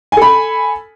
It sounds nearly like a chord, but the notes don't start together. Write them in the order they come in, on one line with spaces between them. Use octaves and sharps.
G#5 A4 B5